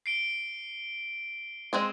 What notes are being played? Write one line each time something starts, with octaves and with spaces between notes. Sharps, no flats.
C7 D7 G7
G#3 C4 G#4